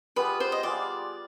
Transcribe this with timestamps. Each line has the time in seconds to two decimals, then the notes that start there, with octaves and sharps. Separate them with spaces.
0.16 G3 B3 F4 G#4 B4
0.40 C5
0.52 D#5
0.63 G3 B3 F4 G#4 D5